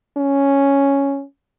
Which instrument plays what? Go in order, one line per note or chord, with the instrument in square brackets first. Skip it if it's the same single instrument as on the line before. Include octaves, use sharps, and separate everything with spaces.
[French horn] C#4